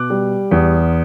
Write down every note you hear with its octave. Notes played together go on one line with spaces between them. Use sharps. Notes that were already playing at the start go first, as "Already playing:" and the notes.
Already playing: B2 D6 F#6
G3
E2